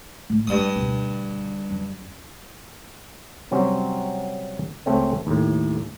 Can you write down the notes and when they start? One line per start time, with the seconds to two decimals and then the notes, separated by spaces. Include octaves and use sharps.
0.30 A2
0.47 G2 A3 B3 D#6
0.75 D2 B2
1.70 F#2
3.51 C3 F#3 G3 C4 C#4
4.86 C#2 A3 C4 C#4
5.27 D#2 A2